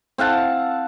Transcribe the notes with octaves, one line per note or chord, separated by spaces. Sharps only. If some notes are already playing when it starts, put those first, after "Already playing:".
C4 F5 F#5 A5